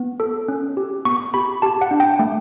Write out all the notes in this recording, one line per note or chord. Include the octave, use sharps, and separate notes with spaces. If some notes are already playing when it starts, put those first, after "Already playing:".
Already playing: B3
A4
C#4
G4
B3 C#6
G4 B5
G4 A5
F#5
D4
G5
A3